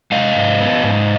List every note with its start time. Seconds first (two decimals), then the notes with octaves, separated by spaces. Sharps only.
0.12 G#3 D#5 F5
0.35 G#2
0.61 B3
0.83 G#2